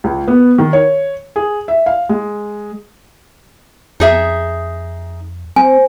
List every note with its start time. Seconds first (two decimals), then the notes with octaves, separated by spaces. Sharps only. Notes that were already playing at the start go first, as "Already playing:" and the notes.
0.04 C#2
0.28 B3
0.58 D#3
0.73 C#5
1.36 G#4
1.68 E5
1.86 F5
2.09 G#3
4.00 F2 D#4 G#4 E5
5.56 F3 C4 G#5